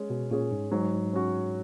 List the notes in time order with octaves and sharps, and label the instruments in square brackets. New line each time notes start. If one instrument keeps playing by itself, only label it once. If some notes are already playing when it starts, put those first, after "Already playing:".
Already playing: [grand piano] G#3 C#4
[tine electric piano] B2
[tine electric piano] A#2 [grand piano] C#4 G#4 C#5
[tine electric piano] G#2
[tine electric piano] G#2 [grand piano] F#3
[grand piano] C#4 F#4